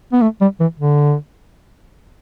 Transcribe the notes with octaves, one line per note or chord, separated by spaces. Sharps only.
B3
A3
G3
E3
D3